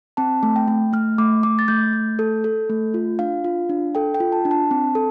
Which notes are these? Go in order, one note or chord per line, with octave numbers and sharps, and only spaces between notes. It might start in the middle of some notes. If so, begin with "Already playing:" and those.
C4 A5
A3
G5
A3
A3 F6
A3 D6
A3 D6
A6
A3 G6
A3
A4
A4
A3
F4
D4 F5
F4
D4
A4 G5
G5
F4
A5
D4
A5
C4
A4